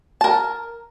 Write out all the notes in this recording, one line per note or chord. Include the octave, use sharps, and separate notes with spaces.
A#4 A5